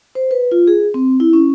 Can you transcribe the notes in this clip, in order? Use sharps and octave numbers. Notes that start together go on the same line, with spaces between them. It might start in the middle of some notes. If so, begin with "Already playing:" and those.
C5
B4
F4
G#4
C4
E4
C#4